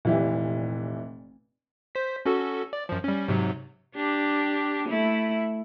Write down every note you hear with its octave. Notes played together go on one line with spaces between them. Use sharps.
F1 A#2 E3 G4
C5 B6
C#4 F#4 A4
D5
F#2 F3
G3 C#4
G#2 C3 F#3
D4 G4
A3 E4